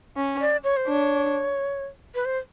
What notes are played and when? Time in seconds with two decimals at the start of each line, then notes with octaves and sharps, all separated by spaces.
0.16 C#4
0.41 D5
0.64 C#5
0.77 C5
0.87 D4 C#5
2.15 B4
2.25 C5